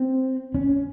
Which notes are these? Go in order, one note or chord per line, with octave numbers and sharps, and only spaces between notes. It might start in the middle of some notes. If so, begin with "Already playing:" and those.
Already playing: C4
C#4